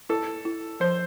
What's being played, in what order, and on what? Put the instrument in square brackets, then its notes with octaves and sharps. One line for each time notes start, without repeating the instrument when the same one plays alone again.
[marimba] E4 [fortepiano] A4
[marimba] E4
[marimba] F3 [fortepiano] C5